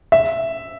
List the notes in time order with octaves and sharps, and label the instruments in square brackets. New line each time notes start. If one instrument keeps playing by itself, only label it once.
[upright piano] E5